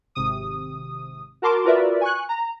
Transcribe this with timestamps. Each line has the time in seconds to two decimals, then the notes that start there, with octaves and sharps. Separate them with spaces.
0.15 G#1 C3 D#6
1.42 F#4 A#4 A5 C6 D6
1.64 F4 F#4 A#4 B4 D5 E5
2.01 G#5 C#6 F#6
2.29 A#5